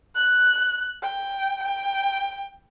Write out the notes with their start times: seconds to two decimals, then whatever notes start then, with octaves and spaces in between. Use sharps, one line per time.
0.16 F#6
1.03 G5
1.63 G5